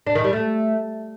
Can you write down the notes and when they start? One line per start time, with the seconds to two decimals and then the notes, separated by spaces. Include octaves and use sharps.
0.07 D4
0.15 D#3
0.24 G3
0.33 A3